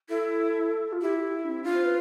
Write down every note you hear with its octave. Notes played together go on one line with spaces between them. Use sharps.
E4 A4
F4
E4 G4
G4
D4
C4
D4 F4
C5
B4